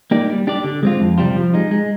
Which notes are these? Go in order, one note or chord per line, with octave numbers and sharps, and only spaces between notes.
A#3 D#4 G4 D5
G3
D4 G4 D5
D3
G#3 C4 F4
F2
C3 G3 C4 F4
F3
G#3 D#4
G#3